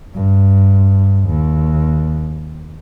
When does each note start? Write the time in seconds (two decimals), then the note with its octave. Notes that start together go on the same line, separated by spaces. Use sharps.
0.14 G2
1.28 D#2